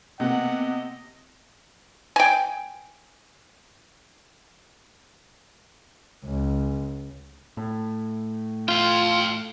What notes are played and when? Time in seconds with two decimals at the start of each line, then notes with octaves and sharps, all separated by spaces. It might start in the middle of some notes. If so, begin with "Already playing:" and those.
0.20 C3 A#3 B3 D#5 F#5
2.16 G5 G#5
6.25 C#2
7.57 A2
8.68 F4 F5 G5